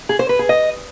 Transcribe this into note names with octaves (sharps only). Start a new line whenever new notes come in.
G#4
C5
B4
G#4
D#5